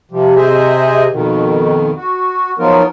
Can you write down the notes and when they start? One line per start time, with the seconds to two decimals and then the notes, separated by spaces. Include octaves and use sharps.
0.11 C3 F3 G3
0.36 C3 G#4 C5 D#5 E5 G#5
1.11 F2 B2 D#3
1.96 F#4
2.59 F3 F#3 B3 D#4 F4 A#4